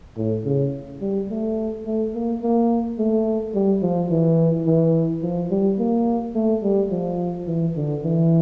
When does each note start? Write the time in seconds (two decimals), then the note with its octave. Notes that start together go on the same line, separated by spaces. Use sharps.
0.17 A2
0.45 C#3
1.01 G3
1.30 A3
1.86 A3
2.14 A#3
2.42 A#3
2.98 A3
3.54 G3
3.82 F3
4.10 E3
4.66 E3
5.23 F3
5.51 G3
5.79 A#3
6.35 A3
6.63 G3
6.91 F3
7.47 E3
7.76 D3
8.03 E3